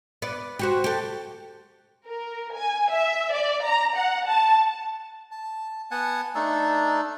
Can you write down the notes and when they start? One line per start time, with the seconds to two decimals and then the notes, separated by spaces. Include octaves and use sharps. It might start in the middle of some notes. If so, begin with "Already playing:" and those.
0.22 B3 D5
0.59 C4 F#4 G4
0.84 G4 A4
2.07 A#4
2.55 G#5
2.91 E5
3.31 D5
3.65 A#5
3.95 F#5
4.27 A5
5.32 A5
5.91 B3 F#5 G#5 A5
6.35 A3 D4 D#4 A4